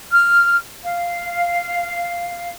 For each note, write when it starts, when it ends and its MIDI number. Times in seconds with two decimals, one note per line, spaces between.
0.12 0.56 89
0.84 2.51 77